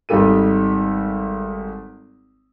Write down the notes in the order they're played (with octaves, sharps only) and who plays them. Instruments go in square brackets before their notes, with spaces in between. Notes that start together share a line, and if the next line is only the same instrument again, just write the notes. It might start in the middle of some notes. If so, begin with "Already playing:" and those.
[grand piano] G#1 G3 D#4 G4 A4 D#7